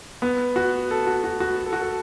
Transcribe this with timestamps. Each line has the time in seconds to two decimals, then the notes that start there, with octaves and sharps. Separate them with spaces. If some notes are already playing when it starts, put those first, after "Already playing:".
0.22 B3
0.56 F#4
0.91 A4
1.07 F#4
1.24 F#4
1.40 F#4
1.66 A4
1.73 F#4
1.82 A4